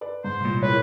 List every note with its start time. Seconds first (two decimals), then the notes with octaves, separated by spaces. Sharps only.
0.01 B4 D5
0.24 G#2 C5
0.41 C2 A#2
0.63 G#3 E4 A#4 B4 C#5